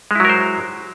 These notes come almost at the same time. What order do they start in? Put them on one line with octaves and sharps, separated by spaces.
G#3 E4 F#3 A#4 C5